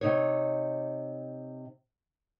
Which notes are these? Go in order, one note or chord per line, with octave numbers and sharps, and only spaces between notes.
C3 D#4 C#5